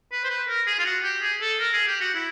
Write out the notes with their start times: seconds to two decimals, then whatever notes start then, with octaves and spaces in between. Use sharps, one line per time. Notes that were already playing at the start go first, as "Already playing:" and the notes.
0.12 B4
0.24 C5
0.30 B4
0.48 A#4
0.67 G#4
0.79 F4
0.85 F#4
1.04 G4
1.22 G#4
1.41 A4
1.59 A#4
1.73 G#4
1.87 G4
2.01 F#4
2.15 E4